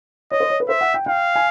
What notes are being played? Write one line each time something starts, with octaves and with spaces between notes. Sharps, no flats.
C#5 D#5
C5
C#5
B4
C5 E5
F#5
G5
F5 G5
G#5